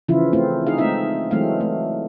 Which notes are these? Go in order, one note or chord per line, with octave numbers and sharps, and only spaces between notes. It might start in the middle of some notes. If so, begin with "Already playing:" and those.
C#3 E3 F3 E4 F4
A3 C4 E4 F4
D#4 G#4 F5
G#3 A3 C4 D#4 E5
E3 F#3 G#3 A3 C4 F5
A3